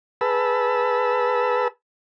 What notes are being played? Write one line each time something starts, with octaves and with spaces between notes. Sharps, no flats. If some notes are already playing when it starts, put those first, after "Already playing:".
G#4 B4 A5 B5 E6